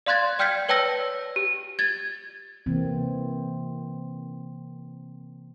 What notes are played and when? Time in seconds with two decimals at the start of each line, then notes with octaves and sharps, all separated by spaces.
0.06 D5 F5 C6 F#6 G#6 A6
0.39 D5 G5 F6 G6 G#6 B6
0.69 B4 C#5 G5 A5 E6 A#6
1.36 G4
1.79 G#6 A6
2.66 C3 E3 A#3 C4